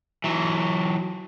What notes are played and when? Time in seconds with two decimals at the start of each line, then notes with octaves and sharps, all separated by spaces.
0.24 E3 F#3